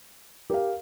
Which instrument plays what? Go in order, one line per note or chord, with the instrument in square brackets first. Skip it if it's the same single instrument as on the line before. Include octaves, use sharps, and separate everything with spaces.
[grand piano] G4 [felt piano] A#4 F5